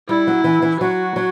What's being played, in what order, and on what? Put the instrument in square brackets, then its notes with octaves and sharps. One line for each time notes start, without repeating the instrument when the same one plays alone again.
[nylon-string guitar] G3 [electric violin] E4
[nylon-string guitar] F#3
E3
E3
[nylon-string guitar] F#3 [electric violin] F#4
[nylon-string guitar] F#3